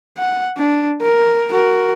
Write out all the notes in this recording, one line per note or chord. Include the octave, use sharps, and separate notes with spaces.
F#5
D4
A#4
F#4 A#4